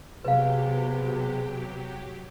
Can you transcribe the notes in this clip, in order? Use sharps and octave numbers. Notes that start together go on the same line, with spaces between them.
C3 F#3 B3 G4 G#4 B4 F5